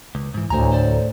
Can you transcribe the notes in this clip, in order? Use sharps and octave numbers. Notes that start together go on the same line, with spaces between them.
C#2
G#2 E3
D2 A2 C5 G#5 A#5
A4 C5 D5